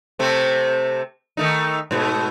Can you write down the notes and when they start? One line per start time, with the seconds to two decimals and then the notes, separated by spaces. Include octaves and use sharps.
0.19 C3 A3 C4
1.37 D#3 A3 D#4
1.91 G#2 B2 A3